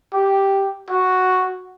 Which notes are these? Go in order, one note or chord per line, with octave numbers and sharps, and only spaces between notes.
G4
F#4